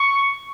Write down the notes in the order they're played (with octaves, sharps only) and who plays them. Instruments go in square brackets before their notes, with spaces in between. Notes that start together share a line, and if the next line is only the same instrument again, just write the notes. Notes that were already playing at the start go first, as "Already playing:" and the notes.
Already playing: [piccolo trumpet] C#6